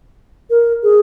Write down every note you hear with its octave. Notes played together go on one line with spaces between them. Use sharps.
A#4
G#4